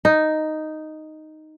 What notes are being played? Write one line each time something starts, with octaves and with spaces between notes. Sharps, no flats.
D#4